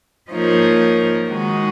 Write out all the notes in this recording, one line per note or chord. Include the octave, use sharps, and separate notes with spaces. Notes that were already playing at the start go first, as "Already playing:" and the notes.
F3 A#3 D#4 A#4 C#5
D#3 G#3 D#4 F#4